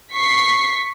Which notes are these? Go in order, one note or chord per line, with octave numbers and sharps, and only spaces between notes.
C#6 B6 C7